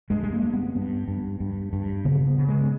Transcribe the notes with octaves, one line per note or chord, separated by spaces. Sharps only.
G2 G#3
G#3
A#3
G2
B3
C#4
G2 B3
G2
G2
G2
C#3 B3
B3
C#3
G#3